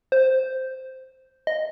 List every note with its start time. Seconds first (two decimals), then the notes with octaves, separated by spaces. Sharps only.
0.12 C5
1.47 D#5